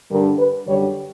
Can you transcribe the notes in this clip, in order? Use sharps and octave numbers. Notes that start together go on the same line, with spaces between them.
G2 D3 G3 A#4
B4
F#2 D3 G3 C#5